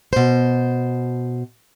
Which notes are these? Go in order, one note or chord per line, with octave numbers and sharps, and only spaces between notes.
B2 C5